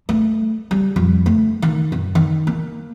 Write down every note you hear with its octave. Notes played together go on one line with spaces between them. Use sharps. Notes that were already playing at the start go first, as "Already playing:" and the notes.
A3
G3
F2
A3
D#3
F#2
D#3
A#3